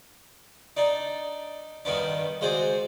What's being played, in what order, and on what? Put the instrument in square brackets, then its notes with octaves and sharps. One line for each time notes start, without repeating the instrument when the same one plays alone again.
[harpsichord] D4 D#4 D5
G2 D#3 B3 D4
G#3 F#4 C5 D5 G#5